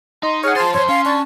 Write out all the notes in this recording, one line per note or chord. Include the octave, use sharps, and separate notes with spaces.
D#4 D#5 C6
G#4 C#5 F#5 F6
F4 C5 A5 C6 F6 A6
F2 C5 C#5 C6
C#4 F5
D4 A5 C#6